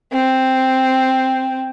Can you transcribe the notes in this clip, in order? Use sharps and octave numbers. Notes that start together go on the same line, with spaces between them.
C4